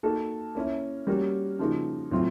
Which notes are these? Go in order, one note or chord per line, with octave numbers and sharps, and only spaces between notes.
A#3 D#4 F#4 A4
A#3 C#4 E4
G3 A#3 C#4 F#4 A#4
C#3 F3 A#3 D#4 F#4
A2 F#3 A3 C4 F4